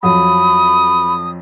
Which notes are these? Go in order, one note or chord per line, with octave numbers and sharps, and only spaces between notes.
F2 F3 F#3 B5 D#6